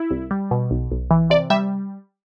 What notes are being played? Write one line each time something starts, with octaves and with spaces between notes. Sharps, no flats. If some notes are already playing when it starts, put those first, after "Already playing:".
Already playing: E4
C2
G3
B2
B1
B1
E3
C3 D5
G3 E5